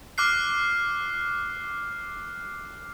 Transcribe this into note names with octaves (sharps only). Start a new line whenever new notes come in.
D6 F6 F#6 C7